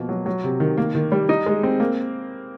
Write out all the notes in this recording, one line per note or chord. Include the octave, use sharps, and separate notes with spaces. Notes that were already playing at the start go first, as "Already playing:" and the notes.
Already playing: B2 F3 A#3
F#3
F#3
C3
D#3
A#3
D#3
G3
D#4
G#3
C4
A#3